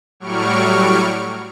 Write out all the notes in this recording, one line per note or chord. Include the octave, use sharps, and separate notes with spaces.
A2 F#3 G3 C#6 F6 D7